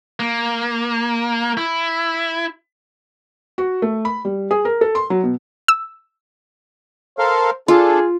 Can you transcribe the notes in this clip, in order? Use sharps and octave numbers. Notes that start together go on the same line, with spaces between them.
A#3
E4
F#4
A3
B5
G3
G#4
A#4
A4
C6
F#3
B2
E6
A4 A#4 C5 F5
D4 F4 G#4 A4